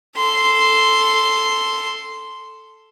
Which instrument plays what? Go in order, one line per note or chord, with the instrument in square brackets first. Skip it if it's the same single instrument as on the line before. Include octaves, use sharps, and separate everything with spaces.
[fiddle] A4 C6